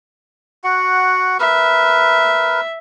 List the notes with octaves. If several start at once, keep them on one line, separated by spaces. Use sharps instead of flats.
F#4 F#5
A#4 B4 E5